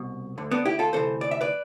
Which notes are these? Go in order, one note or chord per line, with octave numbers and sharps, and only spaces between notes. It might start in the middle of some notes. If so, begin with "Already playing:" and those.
Already playing: C2 B2
D2 D3
B3 D4
E4 G4
F4 A4
D2 C3 E3 A4 C5
D5
E5
B4 D5